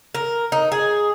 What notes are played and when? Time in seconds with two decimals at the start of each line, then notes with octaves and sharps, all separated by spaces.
0.15 A#4
0.52 D#4
0.72 G#4